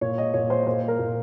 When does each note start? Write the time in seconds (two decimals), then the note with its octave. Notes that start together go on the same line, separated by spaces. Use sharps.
0.01 A#2 C#5
0.18 D#5
0.34 A#2 C#5
0.50 C5
0.67 A#2 C5
0.88 A#4
0.99 A#2